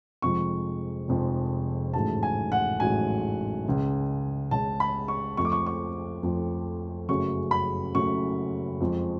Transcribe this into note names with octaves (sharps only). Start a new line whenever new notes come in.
F1 F2 F3 G#3 C#6
F1 F2 F3 G#3
A1 G#2 F#3 A3 A5
G#5
F#5
A1 G#2 F#3 A3 G#5
C#2 C#3 G#3
C#2 C#3 G#3 A5
B5
C#6
F2 F3 A3 C#6
D6
C#6
C#6
F2 F3 A3
F#1 F#2 C#3 F#3 A3 C#6
B5
F#1 F#2 C#3 F#3 A3 C#6
F2 F3 G#3